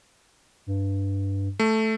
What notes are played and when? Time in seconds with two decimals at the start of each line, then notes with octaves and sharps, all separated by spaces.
0.67 G2
1.60 A3